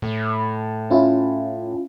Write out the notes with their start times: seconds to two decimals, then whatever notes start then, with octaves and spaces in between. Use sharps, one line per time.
0.02 A2
0.90 C#4 E4 F4